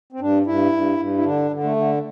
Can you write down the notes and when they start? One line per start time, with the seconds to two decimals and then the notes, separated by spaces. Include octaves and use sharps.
0.12 C4
0.20 G2 D4
0.46 G2 E4
0.72 G2
0.98 G2
1.18 E4
1.24 D3 D4
1.51 D3
1.64 A3
1.76 D3